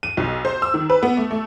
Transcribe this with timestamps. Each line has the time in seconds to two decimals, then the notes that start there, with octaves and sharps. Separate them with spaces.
0.03 D#7
0.17 B1
0.45 C5
0.62 E6
0.74 D#3
0.90 B4
1.03 B3
1.17 A3
1.31 A3